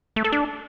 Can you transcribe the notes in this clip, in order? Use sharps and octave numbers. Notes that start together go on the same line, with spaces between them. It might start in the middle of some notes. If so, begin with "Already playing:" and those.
A3
A4
D4